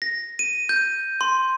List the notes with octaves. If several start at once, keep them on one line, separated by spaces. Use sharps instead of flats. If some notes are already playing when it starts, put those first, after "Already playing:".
A#6
D#7
G6
C6